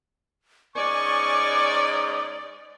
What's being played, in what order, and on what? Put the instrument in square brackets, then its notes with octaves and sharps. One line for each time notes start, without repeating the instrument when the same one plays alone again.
[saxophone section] G#2 C#4 D#5 [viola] D5 [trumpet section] G#5 C#6 [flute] D6